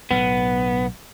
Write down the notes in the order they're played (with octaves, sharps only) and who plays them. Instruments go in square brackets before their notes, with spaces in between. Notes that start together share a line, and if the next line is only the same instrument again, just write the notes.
[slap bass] B1 A2 [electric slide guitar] B3